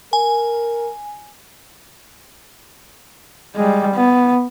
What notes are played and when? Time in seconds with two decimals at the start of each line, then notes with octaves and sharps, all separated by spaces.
0.13 A#4 G#5
3.56 G3 G#3
3.95 B3